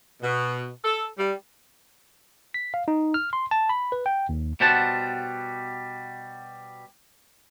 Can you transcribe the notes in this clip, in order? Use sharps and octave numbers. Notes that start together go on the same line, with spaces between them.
B2
A4
G3
B6
F5
D#4
F6
C6
A5
B5
B4
G5
D#2
B2 G3 C5 F#5 A5